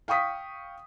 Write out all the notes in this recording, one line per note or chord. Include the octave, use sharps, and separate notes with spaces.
F5 G5 C#6 D#6 B6